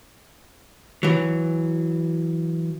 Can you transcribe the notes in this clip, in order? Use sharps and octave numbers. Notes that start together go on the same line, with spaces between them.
E3 F#3